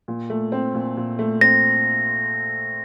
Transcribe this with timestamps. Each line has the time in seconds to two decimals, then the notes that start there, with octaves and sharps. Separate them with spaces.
0.08 A#2
0.30 A3
0.52 C4
0.75 A#2
0.97 A#2
1.19 A3
1.41 C4 A#6